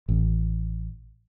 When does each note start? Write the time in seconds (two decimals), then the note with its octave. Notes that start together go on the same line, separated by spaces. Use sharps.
0.08 A1